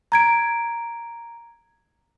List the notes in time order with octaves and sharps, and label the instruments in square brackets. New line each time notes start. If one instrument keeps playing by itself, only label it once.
[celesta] A#5 G#6 D7